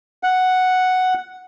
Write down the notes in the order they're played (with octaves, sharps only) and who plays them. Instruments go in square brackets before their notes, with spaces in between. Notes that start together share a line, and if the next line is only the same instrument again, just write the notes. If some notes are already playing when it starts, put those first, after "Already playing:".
[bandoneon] F#5